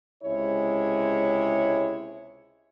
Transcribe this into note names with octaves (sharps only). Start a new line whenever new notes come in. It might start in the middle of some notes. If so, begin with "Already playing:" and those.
C#2 C3 G#3 E4 C#5